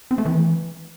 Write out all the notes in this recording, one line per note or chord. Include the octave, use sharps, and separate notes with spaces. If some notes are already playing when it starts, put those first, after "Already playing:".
C4
A3
E3